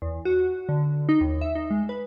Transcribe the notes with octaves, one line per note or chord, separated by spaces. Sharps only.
E2
F#4
D3
D#4
D#2
E5
D#4
G#3
B4